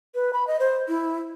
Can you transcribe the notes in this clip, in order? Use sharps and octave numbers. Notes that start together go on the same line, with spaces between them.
B4
B5
D#5
C5
E4